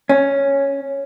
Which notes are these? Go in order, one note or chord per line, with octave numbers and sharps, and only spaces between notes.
C#4